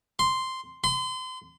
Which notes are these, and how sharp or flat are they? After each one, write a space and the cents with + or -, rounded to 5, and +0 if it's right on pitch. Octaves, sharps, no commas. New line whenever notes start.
C6 -5
C6 -35